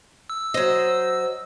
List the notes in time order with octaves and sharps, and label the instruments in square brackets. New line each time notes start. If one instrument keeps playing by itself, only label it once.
[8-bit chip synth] E6
[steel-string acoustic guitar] F#3 D#5 [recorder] C5